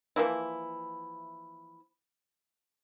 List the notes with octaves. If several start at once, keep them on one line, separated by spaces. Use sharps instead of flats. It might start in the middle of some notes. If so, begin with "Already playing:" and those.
E3 F3 A#3 E4